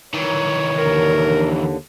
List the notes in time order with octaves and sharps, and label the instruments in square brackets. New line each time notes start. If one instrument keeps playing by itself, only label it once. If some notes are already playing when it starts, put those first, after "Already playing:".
[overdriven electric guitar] D#3 E3 [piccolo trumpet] C#5
[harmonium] D#2 D3 [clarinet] A#4